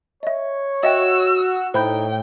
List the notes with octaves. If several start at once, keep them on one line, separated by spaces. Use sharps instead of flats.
C#5 D#5 E5
F#4 D#5 E5 G5 E6
A2 D#4 C5 G5 B5 G6